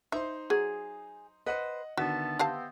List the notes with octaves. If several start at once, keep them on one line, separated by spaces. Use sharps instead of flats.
D#4 C5 E5 C6
F#3 G#4
B4 C5 D#5 F#5
D3 D#3 B3 F#4 E5 A5
B3 C4 G4 F5 A5